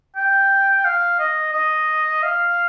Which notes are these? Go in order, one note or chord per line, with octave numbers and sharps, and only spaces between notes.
G5
F5
D#5
D#5
F5